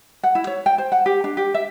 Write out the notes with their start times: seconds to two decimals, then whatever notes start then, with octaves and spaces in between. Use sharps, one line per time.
0.23 F#5
0.35 E4
0.47 C#5
0.66 G5
0.78 C5
0.92 F#5
1.06 G4
1.24 D4
1.37 G4
1.54 E5